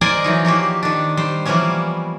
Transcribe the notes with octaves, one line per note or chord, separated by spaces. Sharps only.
G#4 A#4 C5 D5 D#5 G#5
E3 F#3 D#4
F3 A#3 F#4 G4
D#3 D4
G3 C5
E3 F3 G3 A#3 B3 C#4